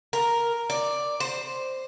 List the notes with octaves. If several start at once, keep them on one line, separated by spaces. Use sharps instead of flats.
A#4
D5
C5